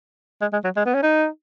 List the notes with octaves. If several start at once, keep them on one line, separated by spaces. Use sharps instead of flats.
G#3
G#3
F#3
G#3
B3
C#4
D#4